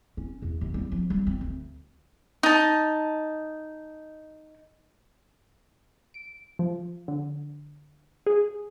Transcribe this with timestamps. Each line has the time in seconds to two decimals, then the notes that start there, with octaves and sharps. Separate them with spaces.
0.17 C#4
0.42 E2
0.61 D#2
0.74 G3
0.92 F3
1.10 G3
1.27 C4
1.41 D2
2.43 D#4 A5
6.14 D7
6.59 F3
7.08 D3
8.26 G#4